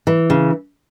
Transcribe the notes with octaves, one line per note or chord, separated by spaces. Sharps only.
E3
C#3